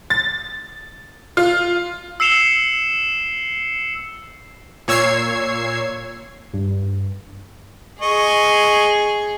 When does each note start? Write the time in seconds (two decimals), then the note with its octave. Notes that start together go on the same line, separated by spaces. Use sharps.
0.10 A6
1.37 F4
2.20 E6 C7 C#7 E7 F7 G7
4.88 A#2 C#5 E6 G#6 C7
6.53 G2
8.01 G#4 D#5 C#6